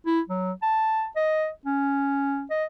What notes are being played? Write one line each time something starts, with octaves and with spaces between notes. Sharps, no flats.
E4
F#3
A5
D#5
C#4
D#5